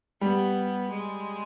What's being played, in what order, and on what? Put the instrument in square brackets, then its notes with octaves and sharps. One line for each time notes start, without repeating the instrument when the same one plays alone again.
[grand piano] G3 [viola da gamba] B3
[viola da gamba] G#3